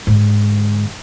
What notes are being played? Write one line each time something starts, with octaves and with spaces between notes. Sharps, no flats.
G#2 D3